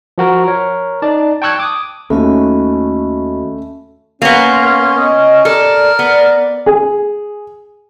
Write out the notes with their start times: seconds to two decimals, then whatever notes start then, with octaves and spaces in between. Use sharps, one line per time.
0.18 F3 F#4 A#4
0.44 A#4 C#5
1.02 D#4 D5 A5
1.42 G5 A5 C#6 E6 F#6 G#6
1.60 D6 D#6
2.10 D#2 A3 C#4 F#4 D#5 B5
4.22 A#3 B3 C#4
4.52 C6
4.97 D#5
5.45 A4 A#4 D5
5.99 B3
6.66 G#4